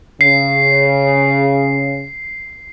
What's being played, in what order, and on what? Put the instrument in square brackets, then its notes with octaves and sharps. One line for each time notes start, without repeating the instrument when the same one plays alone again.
[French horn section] C#3 [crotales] C7